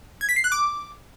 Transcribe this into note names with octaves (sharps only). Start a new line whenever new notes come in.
G#6
B6
C7
F#6
D6